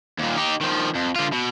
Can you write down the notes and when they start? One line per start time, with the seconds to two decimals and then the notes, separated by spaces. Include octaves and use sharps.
0.18 D#2 A#2
0.37 D#4 G4
0.61 D#3 F3
0.95 F2
1.16 D3 F4
1.32 B2